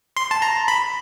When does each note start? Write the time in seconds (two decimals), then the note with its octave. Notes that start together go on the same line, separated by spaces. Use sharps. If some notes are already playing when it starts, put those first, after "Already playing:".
0.17 C6
0.31 A5
0.42 A#5
0.68 B5